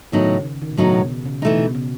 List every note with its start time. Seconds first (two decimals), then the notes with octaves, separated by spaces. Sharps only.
0.12 A2 D#3 F#3 B3 D#4
0.29 C#3
0.45 C#3
0.62 D#3
0.71 B2
0.77 A2 C#3 F#3 B3 D#4
0.94 B2
1.10 C#3
1.25 C#3
1.42 B2 E3 A3 D#4
1.59 B2
1.75 C#3